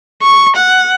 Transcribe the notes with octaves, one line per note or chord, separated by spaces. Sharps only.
C#6
F#5